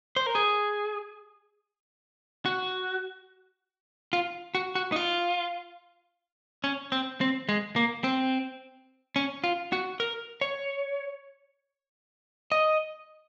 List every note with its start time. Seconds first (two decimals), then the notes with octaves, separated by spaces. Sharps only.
0.16 C5
0.26 A#4
0.35 G#4
2.45 F#4
4.13 F4
4.55 F#4
4.75 F#4
4.92 D#4
4.96 F4
6.64 C#4
6.92 C4
7.21 C4
7.49 G#3
7.76 A#3
8.04 C4
9.16 C#4
9.44 F4
9.72 F#4
10.00 A#4
10.41 C#5
12.52 D#5